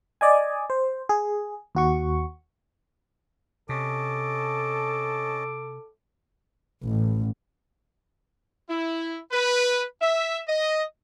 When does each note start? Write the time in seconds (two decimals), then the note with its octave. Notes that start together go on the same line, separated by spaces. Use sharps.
0.21 D5 D#5 G#5
0.70 C5
1.09 G#4
1.75 D#2 F#4 C#6
3.69 C3 C#4 A4 D#5 A5 D6
6.83 A1
8.69 E4
9.32 B4
10.01 E5
10.48 D#5